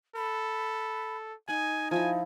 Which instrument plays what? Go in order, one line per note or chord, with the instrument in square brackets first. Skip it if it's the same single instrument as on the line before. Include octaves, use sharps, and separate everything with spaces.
[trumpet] A4 [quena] B5
[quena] D#4 [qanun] F#5 [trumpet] G#5
[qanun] F3 E4 [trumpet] G#5